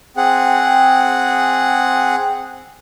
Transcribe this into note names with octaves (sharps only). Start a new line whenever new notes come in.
C4 G#4 F#5